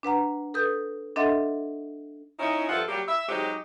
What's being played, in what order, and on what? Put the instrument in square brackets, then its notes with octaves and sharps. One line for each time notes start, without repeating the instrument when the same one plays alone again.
[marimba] D4 B4 F#5 A#5
A4 B4 D#6 G6
D4 A4 D#5 E5 F#5 C6
[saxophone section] C#4 D#4 E4
G2 F3 F4 A4 E5 F#5
F#3 G3 A#3 G4
E5
F#3 G#3 C4 D#4 G4